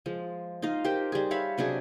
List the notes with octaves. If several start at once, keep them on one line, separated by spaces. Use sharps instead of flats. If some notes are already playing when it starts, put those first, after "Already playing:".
F3 G#3
D#4 F4 D#5 F5
G4 A#4 C5 G5
G3 G#4
C#5 E5 F5 B5
C3 F#3 D4 G#4